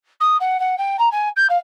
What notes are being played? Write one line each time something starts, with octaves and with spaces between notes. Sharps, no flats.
D#6
F#5
F#5
G5
A#5
G#5
G6
F5